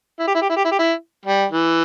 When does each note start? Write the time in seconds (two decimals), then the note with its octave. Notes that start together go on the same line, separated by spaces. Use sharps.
0.19 E4
0.27 G4
0.35 E4
0.42 G4
0.49 E4
0.57 G4
0.65 E4
0.72 G4
0.79 E4
1.26 G3
1.52 E3